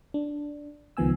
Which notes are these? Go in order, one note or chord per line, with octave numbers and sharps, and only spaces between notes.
D4
C#2 D#3 F3 B3 G#5 E6